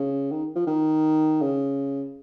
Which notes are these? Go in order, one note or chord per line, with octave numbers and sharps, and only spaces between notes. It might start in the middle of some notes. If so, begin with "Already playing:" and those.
Already playing: C#3
D#3
F3
D#3
C#3